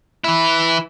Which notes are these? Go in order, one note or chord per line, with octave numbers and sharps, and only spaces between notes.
E3 E4